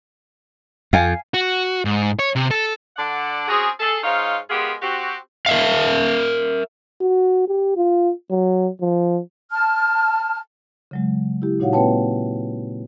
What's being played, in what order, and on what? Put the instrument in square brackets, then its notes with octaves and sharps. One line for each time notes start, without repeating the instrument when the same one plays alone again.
[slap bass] F2 [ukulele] F5 G#5
[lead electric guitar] F#4
G#2
C#5
C3
A4
[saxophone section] D3 D5 F#5
C4 C#4 F#4 G#4
G#4 A4
G#2 D#4 F4 C#5 F5
G#3 B3 F4 G4 G#4 A#4
C4 F#4 G4
[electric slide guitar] A#4 E5 F5
[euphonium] F#4
G4
F4
F#3
F3
[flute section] A5 F6
[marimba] C#3 F#3 G#3
E4 G4
A#2 D#4 F#4 C#5 F5 F#5
A#3 C4 B4 C#5 G5 A5